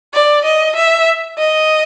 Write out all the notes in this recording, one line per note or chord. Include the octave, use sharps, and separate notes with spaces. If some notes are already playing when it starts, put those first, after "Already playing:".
D5
D#5
E5
D#5